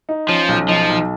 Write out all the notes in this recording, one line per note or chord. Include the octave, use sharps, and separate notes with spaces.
D#4
F3 C#4
B1
F3 D#4
B1